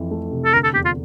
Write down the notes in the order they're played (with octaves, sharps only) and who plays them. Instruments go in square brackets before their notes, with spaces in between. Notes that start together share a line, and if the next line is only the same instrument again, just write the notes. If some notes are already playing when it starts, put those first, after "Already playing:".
Already playing: [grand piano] F2 E3
A3
C3
[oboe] A4
[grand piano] D3 [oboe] A#4
[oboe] A4
[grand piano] E2 [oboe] G4
[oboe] F4